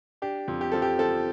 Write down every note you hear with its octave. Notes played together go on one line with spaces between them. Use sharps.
D4 G4
F2
G4
F3 A4
G4
F3 A4